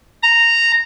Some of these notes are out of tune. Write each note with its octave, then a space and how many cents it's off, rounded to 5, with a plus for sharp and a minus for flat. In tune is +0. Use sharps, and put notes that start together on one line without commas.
A#5 -10